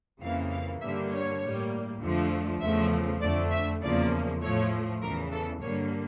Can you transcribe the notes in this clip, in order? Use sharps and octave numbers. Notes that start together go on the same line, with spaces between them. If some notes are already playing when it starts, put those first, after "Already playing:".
F2 C#3 E3 A#3 F5
F5
G2 D3 G3 A#3 E5
C#5
A2 G3 A#3
F2 D3 F3 A3
E2 C#3 F3 A3 E5
F2 D3 A3 D5
E5
E2 C#3 F3 A#3 D5
A2 F3 A3 C#5
E2 C#3 E3 A#4
A4
G2 D3 G3 A#3 C#5